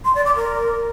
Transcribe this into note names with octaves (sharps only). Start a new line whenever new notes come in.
C6
D5
D6
A#4